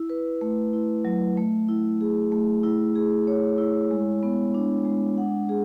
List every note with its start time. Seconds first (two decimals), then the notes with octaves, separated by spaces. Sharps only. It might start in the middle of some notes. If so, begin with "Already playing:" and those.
Already playing: E4
0.10 B4
0.41 A3
0.73 E4
1.05 F#3
1.37 A3
1.68 E4
2.01 G#4
2.32 A3
2.63 E4
2.95 G#4
3.27 C#5
3.58 E4
3.91 G#3
4.23 B3
4.54 D4
4.85 G#3
5.18 F#5
5.49 G#4